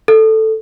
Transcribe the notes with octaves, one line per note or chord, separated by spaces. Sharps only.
A4